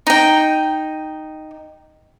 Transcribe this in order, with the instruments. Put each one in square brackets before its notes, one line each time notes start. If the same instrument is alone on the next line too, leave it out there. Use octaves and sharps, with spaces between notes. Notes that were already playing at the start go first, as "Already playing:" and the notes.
[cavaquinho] D#4 G5